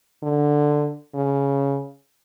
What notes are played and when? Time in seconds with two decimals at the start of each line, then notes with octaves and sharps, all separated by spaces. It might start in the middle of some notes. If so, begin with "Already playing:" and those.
0.23 D3
1.14 C#3